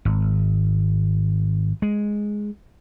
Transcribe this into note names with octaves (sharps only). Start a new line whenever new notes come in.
G#1
G#3